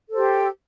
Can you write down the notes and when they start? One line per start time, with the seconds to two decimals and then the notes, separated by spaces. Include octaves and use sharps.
0.09 A4
0.12 C5
0.16 G4